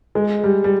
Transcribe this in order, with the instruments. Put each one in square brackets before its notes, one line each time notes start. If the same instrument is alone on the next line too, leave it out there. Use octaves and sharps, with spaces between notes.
[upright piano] G#3
G3
G3